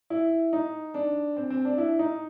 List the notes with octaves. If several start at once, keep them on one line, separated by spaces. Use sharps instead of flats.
E4
D#4
D4
C4
C4
D4
E4
D#4